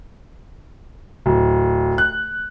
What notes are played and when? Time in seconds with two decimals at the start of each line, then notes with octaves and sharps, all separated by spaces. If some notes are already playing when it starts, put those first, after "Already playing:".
1.26 D1
1.98 F#6